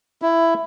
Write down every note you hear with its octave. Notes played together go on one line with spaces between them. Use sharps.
E4